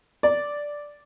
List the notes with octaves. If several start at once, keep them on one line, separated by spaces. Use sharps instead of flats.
D5